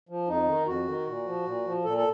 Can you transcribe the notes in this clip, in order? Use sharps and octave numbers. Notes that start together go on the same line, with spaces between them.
F3
F2 D#4
D#3
F2 F#4
D#3
A#2
F3
A#2
F3
A#2 A4
A4